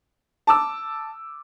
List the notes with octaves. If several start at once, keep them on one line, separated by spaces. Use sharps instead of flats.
A5 D6 E6